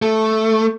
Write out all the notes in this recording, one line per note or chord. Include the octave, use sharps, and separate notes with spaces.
A3